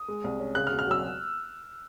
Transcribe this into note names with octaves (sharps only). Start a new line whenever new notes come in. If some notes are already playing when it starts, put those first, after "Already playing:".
Already playing: D#6
G#3
C2
C#4
C#3 F#6
F6
E1
F6
F#3 E6